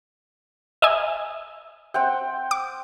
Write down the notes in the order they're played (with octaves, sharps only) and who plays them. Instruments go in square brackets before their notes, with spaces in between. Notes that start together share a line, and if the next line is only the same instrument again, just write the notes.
[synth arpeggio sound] D#5 E5 G#5
[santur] C4 F#5 G5
[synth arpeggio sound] D6